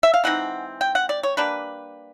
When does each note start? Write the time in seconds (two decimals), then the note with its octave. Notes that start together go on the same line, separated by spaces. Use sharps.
0.03 E5
0.14 F5
0.24 E3 G#3 C4 D#4 F#5
0.81 G5
0.95 F#5
1.09 D5
1.23 C#5
1.37 G3 A#3 D4 B4